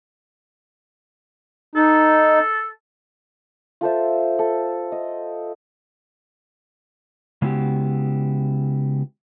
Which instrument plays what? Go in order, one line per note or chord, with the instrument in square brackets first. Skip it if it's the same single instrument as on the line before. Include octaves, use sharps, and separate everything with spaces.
[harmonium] D#4 [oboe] A4
[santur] F4 A4 C5 E5
A4
D#5
[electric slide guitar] C#3 G#3 B3 E4 F#4 G4